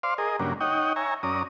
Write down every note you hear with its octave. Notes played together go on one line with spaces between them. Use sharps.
C5 D5 F5 C6
G#4 A#4 D#5
G2 C#3 F#3 A#3 D4
D#4 C#5 D#5 F#5 G5
C#5 E5 G#5 A#5
F#2 C#4 D5 A#5 D#6